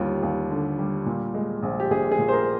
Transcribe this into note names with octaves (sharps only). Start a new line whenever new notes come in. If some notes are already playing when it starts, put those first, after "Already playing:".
Already playing: D#2 D3 G3 F4
D#2
D3
G3
A#2
G#3
A#1
G4
A#1 G#4
G#4
A#2
C5
A#4